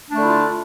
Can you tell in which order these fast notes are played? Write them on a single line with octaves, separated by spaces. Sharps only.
D4 A3 D3 E4 F4